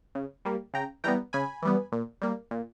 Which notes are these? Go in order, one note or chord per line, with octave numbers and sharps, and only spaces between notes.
C#3
G3 A#3
C#3 G5 A#5
E3 G3 B3 G5 A#5
C#3 G#5 B5
E3 G3 B3
A#2
G3 A#3
A#2